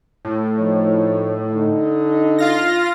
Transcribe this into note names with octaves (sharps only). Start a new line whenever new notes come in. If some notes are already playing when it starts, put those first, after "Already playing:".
A2
F3 D#4 C#5
D3 D#4
F4 F5 A#6